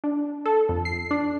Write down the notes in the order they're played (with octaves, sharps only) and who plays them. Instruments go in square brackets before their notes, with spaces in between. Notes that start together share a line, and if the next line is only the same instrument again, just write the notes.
[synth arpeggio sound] D4
A4
F2
C7
D4